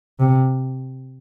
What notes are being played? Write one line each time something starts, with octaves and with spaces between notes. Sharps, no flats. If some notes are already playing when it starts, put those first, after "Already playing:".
C3